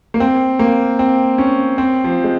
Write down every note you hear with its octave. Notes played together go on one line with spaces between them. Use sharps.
A#3
C4
A#3
C4
C#4
C4
F3
G#3